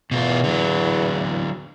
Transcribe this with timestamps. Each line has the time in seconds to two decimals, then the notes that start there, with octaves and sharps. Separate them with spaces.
0.11 E2 B2 F4
0.44 D3 F#3